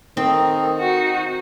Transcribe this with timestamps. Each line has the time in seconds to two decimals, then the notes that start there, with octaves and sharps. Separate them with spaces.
0.17 D#3 C4 A4 A#4 D#6
0.79 D#4 F#4